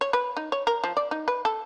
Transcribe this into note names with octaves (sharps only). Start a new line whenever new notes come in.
C#5
B4
D#4
C#5
A#4
F3
D5
D#4
B4
A4